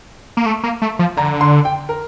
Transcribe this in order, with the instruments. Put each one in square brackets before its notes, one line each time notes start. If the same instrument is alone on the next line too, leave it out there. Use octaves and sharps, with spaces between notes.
[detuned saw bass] A#3
A3
A#3
A3
F3
[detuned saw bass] D3 [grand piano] A#5
[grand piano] C6
G5
A#4